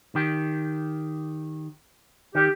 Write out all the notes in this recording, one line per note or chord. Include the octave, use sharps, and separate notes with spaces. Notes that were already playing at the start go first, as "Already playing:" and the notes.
D#3 G4
D#3 G4